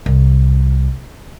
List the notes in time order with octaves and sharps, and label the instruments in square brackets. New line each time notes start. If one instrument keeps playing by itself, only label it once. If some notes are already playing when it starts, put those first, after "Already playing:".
[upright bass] C2